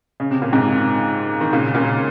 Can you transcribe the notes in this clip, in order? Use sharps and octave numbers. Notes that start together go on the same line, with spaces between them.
C#3
C3
A#2
G#2 C3
D#3
A#2 C#3
A#2 C#3